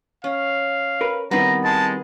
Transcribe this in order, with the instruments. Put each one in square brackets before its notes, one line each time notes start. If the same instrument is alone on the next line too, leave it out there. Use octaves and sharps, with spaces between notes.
[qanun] C#4 [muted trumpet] F5
[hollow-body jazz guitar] A#4 B4
[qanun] D#3 B3 [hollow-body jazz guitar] G3 C4 E4 [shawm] A#5
[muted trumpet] G#3 [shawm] A5